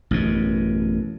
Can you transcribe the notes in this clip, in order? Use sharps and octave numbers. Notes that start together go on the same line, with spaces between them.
A1 F#2 B2